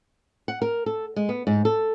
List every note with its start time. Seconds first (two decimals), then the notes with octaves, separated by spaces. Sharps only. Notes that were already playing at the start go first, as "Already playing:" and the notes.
0.48 F#5
0.62 A#4
0.86 A4
1.16 G#3
1.29 B3
1.47 G#2
1.65 A4